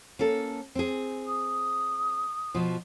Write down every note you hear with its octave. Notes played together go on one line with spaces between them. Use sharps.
A#3 C#4 A4
C4 G#4
D#6
B2 F3